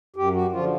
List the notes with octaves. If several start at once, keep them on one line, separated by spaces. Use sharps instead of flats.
F#2 G4
F#4
D3 F3 F4